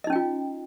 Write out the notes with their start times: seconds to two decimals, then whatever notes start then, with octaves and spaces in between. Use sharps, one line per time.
0.04 D#5
0.07 D#4
0.10 C#4
0.13 G5
0.16 F4